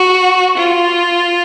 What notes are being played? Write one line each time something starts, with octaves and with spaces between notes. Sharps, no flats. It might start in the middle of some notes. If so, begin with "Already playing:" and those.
Already playing: F#4
F4